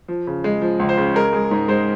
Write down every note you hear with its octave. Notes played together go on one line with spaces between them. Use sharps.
F3
C#3
G#3
F3
C#2
C5
C#3
G#3 A#4
G#3
G#2
G#3 C5